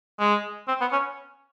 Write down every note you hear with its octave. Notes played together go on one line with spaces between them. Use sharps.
G#3
C4
B3
C#4